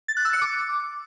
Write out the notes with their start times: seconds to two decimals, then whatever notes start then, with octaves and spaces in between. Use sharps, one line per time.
0.08 A6
0.17 F#6
0.25 E6
0.33 C#7
0.41 D6